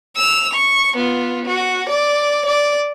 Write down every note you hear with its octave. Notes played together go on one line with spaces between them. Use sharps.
E6 F7
C#6
B3 F4
F#4
D5
D5